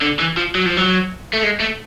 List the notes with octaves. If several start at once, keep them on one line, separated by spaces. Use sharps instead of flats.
D3
E3
F3
F#3
F3
F#3
A3
G#3
A3